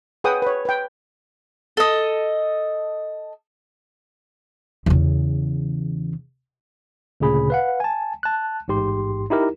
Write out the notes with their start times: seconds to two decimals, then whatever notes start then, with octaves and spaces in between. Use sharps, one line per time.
0.24 G#4 B4 C#5 F#5 G5 D#6
0.42 B4 C#5
0.65 B4 G5
1.77 A4 D#5
4.86 E2 C#3
7.20 D2 A#2 C#3 G#4 B5
7.50 B4 F5 F#5
7.80 G#5 A5
8.23 A5 F#6
8.68 A1 G#2 G4 C6
9.30 D#4 E4 G4 A#4